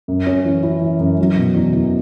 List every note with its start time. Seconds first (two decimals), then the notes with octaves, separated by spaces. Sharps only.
0.08 F#2
0.27 C#4
0.45 E3
0.63 E4
0.81 E3
0.99 F#2
1.19 F#3
1.37 B2
1.55 E2
1.74 E2